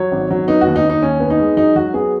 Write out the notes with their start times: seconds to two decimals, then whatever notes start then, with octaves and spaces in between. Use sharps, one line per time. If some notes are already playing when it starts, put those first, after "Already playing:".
Already playing: F#3 C#5
0.12 G#1
0.30 F#3
0.48 B3 D#4
0.61 F#4
0.66 D#2
0.76 D#4
0.84 D#2
0.90 D#4
1.02 D#2 C#4
1.20 B3
1.30 D#4
1.40 G#3
1.57 F#3 D#4
1.76 F#3 F#4
1.94 B3 G#4